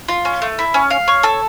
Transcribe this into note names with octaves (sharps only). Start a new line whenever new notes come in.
F4
C#4
A3
E4
C#4
F5
C#5
A4